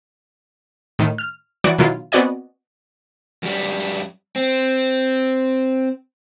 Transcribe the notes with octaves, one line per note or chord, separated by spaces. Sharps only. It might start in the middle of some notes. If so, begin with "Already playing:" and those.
A2 D#3
F6
E3 F#3 F#4 D5 F#6 D7
B2 D#3 F#3 E4 F4
B3 C4 F#4 D5 D#5 G#5
F#2 G3
C4